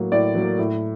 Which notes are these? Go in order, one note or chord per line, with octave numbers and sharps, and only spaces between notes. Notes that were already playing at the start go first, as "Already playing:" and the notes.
Already playing: A2 F#3 A#3
A2 D5
F#3 A#3
A2